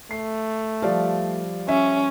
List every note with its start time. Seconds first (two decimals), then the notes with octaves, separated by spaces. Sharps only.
0.11 A3 C7
0.82 F3 G3 D5 F5
1.69 C#4 E5